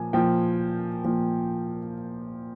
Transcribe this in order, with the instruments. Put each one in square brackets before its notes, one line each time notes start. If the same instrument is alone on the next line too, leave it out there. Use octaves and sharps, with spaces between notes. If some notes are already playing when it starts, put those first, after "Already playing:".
Already playing: [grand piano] A#2 F3 G#5
A#2 F3 G5
A#2 F3